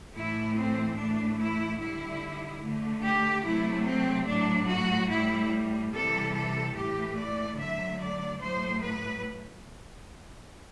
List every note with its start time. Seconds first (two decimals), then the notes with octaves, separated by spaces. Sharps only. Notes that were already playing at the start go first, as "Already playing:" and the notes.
0.14 A2 E3 A3 E4
0.57 C4
0.97 A2 E3 A3 D4
1.38 E4
1.80 D3 G3 E4
2.63 D3 A3
3.03 G4
3.45 C3 F#3 A3 E4
3.85 C4
4.27 A2 F#3 A3 D4
4.69 F#4
5.10 A2 G3 E4
5.92 C3 E3 G3 A4
6.33 A4
6.74 A2 E3 A3 G4
7.16 D5
7.57 D3 F#3 A3 E5
7.99 D5
8.39 A2 F#3 A3 C5
8.81 B4